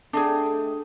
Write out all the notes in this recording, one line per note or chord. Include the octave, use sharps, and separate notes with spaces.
A3 D4 G#4 D#5 G5